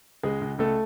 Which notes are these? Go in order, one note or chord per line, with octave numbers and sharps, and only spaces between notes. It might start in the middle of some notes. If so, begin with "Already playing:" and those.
C#2 G#3 G#4
C#2
C#2 A3 A4